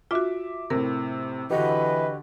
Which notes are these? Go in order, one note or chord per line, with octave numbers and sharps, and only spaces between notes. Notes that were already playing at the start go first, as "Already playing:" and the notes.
F4 F#4 E5 D6
A2 C3 A#4
D3 E3 F#4 G4 B4 D#5